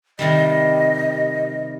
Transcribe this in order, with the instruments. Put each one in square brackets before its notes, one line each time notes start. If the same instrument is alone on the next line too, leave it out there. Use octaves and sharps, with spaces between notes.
[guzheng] C3 D#3 G3 [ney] D#5